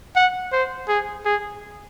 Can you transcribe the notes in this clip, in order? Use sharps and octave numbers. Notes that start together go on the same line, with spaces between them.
F#5
C5
G#4
G#4